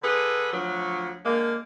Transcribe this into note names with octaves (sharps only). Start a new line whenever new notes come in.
D3 G#4 A4 B4
D2 F3 F#3
D3 G#3 A#3